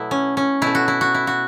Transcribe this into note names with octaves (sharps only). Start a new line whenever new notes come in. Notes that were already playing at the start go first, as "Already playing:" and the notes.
Already playing: B2 F#3 A3 B3 E4
C#4
C#4
B2 A3 E4
F#4
E4
F#4
E4
F#4